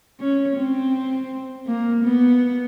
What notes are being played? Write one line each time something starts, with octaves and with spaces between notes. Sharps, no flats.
C#4
C4
A#3
B3